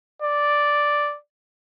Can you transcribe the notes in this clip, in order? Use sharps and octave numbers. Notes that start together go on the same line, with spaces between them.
D5